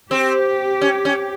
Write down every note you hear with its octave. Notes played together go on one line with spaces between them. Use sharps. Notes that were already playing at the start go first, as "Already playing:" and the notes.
C4 G4
C#4
C#4